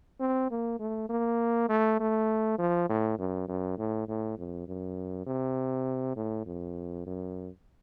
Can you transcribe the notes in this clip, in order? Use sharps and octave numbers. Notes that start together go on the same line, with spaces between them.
C4
A#3
A3
A#3
A3
A3
F3
A2
F#2
F#2
A2
A2
F2
F#2
C3
A2
F2
F#2